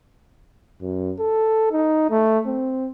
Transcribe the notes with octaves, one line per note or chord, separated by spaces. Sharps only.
F#2
A4
D#4
A3
C4